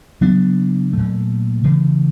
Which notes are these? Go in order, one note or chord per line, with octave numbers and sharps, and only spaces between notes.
C#3 F#3 B3 D4
A#2 F#3 A3
C#3 E3 A3